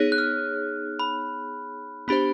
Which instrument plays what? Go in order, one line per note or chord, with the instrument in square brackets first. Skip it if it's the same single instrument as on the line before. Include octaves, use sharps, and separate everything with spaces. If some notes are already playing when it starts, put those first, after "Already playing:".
Already playing: [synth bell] B3 D#4 G#4 C#5
[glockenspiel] F#6
F6
B5
[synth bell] B3 D4 G4 C5 [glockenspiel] B5